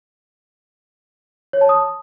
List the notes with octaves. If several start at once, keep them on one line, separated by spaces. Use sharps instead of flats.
C#5
A5
D#6